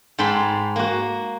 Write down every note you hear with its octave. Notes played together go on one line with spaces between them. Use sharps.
G#2 G5 A5 B5 C6
A#3 F#4